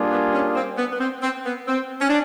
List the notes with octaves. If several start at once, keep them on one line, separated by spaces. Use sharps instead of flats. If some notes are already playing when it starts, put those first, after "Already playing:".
Already playing: G3 A#3 D4 F4 G#4
B3
C#4
C4
B3
B3
C4
C4
B3
C4
C#4
D4